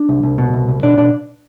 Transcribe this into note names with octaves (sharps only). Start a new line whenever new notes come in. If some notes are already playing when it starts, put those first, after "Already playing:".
Already playing: D4
C2
C2
B2
C2
C2
B2 D4 D5
B2 D4 D5